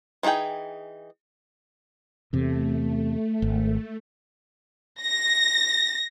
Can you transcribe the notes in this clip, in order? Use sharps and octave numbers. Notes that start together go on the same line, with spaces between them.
E3 D#4 F4 G#4 G5
E2 C3 A3
G#1
A#6